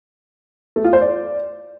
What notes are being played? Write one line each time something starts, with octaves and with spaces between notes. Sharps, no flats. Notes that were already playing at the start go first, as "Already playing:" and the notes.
A3
F4
C5
D5